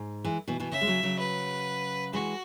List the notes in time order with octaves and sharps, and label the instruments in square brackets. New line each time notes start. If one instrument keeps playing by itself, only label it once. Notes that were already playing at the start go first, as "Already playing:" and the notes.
Already playing: [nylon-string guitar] G#2
E3 G#3
B2 E3
B2 E3
[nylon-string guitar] C#3 [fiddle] E5
[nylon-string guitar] G#3
C#3 F#3
C#3 F#3
[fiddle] B4
[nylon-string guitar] E3 G#3 [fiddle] F#4